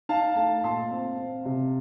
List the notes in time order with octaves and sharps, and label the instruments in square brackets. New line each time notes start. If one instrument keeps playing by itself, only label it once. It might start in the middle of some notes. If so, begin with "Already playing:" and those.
[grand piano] D#4 [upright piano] F5 A5
[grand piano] A3 [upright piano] F5 A5
[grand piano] A#2 [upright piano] A5 C6
[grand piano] C4
C4
C3